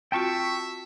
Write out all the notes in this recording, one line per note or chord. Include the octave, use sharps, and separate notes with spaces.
C4 F4 F#4 E5 G5 A5 C#6